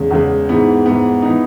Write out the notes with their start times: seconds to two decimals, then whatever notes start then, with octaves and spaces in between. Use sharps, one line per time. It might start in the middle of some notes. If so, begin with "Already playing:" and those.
Already playing: E2 C#3 G#3
0.11 E2 C#3 G#3
0.49 G#2 E3 B3
0.86 G#2 E3 B3
1.22 E3 B3 D#4